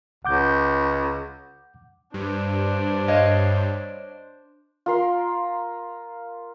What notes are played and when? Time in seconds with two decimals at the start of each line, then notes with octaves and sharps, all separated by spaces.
0.25 C#2 F#5 D6 G6
2.14 G2 D4 C5
3.08 C#5 D#5 F5
4.86 F4 A#4 C6